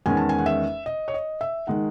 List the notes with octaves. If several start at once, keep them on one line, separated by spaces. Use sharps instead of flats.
E2 D#3 G#3 C#4 G#5
A5
G#5
F#5
E5
D#5
C#5
D#5
E5
D#3 G#3 D#4 F#5